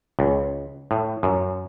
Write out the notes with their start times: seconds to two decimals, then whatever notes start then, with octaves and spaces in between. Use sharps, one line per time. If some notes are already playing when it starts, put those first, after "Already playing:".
0.19 C#2
0.91 A2
1.23 F#2